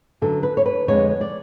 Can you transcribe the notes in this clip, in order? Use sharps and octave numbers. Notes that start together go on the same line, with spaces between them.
F#2 D3 F#3 B3 A4
B4
C#5
B4
F2 D3 G#3 B3 D4 C#5
D5